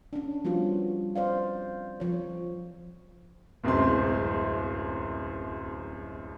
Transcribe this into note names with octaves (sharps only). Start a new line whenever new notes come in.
C#4 D4
F3 G3 B3 F4 F#4
C4 C5 D5 F5
F3 C#5
D1 C2 F#2 G#3 C4 C6